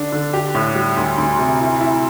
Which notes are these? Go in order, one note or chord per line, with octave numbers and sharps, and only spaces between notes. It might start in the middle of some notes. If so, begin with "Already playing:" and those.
Already playing: D3 D4
D3
G4
A2
G3
D2
D2
C3
E4
E4